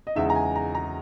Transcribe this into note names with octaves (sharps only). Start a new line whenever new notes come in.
D#5
E2 C#3 G#3 D#4 E5
A#5
G#5
A#5
A#5